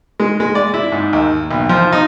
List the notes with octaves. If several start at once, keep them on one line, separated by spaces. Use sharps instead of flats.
G#3
G#3
D5
E4
G#2
D#2
B1
F3
D#4